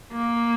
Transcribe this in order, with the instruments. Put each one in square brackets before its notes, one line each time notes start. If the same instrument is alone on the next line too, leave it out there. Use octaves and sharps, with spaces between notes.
[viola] A#3